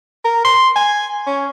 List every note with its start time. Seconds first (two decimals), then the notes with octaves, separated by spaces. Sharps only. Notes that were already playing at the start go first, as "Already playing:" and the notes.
0.25 A#4
0.44 C6
0.76 G#5
1.27 C#4